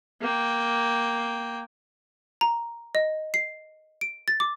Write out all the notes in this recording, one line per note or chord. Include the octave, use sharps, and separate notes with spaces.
A#3 G5
A#5
D#5
C7
D7
A6
D6